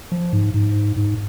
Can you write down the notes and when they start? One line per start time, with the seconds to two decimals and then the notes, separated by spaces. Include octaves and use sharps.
0.12 F3
0.33 G#2
0.54 G#2
0.96 G#2